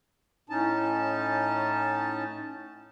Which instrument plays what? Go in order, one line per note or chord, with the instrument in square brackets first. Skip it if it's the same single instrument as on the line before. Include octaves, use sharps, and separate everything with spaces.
[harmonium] A2 C#4 D#4 A5